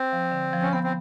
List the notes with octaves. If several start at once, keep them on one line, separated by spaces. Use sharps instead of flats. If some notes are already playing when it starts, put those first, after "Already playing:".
Already playing: C4
F3
D3
F3
C#4
B3 C4
C4